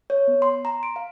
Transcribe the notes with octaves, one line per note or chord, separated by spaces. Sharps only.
C#5
B3
C6
A#5
D7
F5